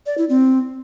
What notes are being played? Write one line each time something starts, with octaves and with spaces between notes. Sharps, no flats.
D5
E4
C4